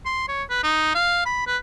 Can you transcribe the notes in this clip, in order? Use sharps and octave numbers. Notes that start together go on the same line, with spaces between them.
C6
C#5
B4
D#4
F5
B5
B4